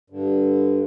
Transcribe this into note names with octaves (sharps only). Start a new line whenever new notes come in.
G2 D3